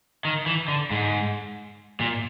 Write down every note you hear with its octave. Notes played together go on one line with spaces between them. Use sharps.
D#3
E3
D3
G#2
A#2